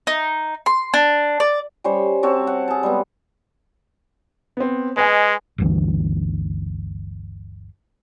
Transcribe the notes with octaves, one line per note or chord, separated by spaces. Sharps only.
D#4
C6
D4
D5
G3 C#4 C5 C#5
C4 F#4 C#5 A5
F#5
G#4 A5
G3 G#3 B3
B3 C4
G#3 B4 D#5 G#5
G1 D2 E3